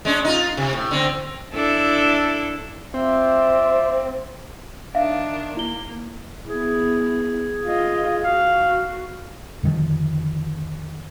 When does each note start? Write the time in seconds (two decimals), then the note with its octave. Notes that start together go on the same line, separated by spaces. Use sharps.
0.05 G#3 C#4 D4
0.25 D#4 F4
0.57 C3
0.73 A2
0.91 D3 C4
1.54 D4 E4 A4
2.94 C4 F4 D5 E5
4.95 D#3 D4 E5 F5
5.57 A#3 E4 G7
6.47 B3 E4 G#4
7.66 F4 D#5
8.24 F#4 F5
9.63 F2 D3 D#3 F3